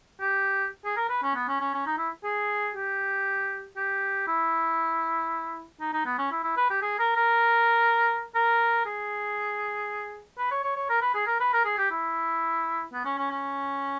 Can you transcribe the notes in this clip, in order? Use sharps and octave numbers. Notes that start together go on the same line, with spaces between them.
G4
G#4
A#4
B4
C#4
B3
C#4
C#4
C#4
D#4
E4
G#4
G4
G4
E4
D#4
D#4
B3
C#4
E4
E4
B4
G4
G#4
A#4
A#4
A#4
G#4
B4
C#5
C#5
C#5
A#4
B4
G#4
A#4
B4
A#4
G#4
G4
E4
B3
C#4
C#4
C#4